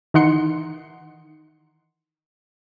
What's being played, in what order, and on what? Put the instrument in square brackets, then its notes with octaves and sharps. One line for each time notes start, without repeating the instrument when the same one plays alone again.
[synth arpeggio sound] D#3 E3 D#4 F#5 C6 C#7